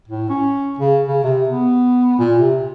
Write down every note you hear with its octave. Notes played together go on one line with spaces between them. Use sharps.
A2
C#4
C#3
C#3
C3
B3
A#2
C3